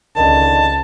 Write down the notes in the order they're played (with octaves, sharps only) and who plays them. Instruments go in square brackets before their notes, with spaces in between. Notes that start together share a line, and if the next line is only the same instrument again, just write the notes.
[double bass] C#2 [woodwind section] D3 D#3 [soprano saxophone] A5